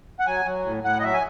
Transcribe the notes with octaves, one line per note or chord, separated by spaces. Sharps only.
F#5
F#3 G#5
F#3
A2
A2 F#5
D#5
F#3 E5
G#5